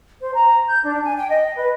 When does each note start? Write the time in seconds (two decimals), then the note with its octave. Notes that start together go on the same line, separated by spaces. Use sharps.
0.20 C5
0.34 A#5
0.67 G6
0.83 D4
1.04 G#5
1.17 G5
1.30 D#5
1.56 B4